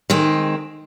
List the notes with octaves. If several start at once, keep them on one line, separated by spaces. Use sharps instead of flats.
D#3 G#3 C4